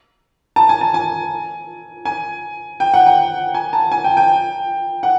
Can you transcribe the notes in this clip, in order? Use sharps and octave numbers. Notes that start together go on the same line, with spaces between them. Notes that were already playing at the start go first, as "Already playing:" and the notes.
A5
G#5
A5
G#5
G#5
G5
F#5
G5
G#5
A5
G#5
G5
G5
F#5